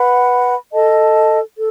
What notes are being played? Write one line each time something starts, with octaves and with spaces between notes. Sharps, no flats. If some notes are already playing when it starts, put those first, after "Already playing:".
Already playing: B4 F#5 B5
A4 D#5 A5
A4